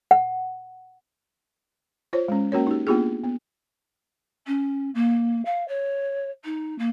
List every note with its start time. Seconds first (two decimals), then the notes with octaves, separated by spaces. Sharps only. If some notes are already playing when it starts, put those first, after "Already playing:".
0.11 F#5
2.13 F4 C5 C#5
2.28 G#3 C#4
2.52 A#3 C#4 F#4 A#4 C#5
2.67 D#4 G4
2.87 A#3 B3 D4 F4 G4 G#4
3.24 B3
4.47 C#4
4.94 A#3
5.45 F5
5.68 C#5
6.44 D#4
6.78 A#3